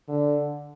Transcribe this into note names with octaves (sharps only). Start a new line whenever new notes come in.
D3